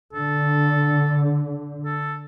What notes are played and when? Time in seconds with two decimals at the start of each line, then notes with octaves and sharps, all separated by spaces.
0.13 D3 A4
1.85 A4